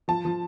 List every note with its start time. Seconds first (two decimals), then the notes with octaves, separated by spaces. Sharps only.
0.08 F3 A5
0.25 F3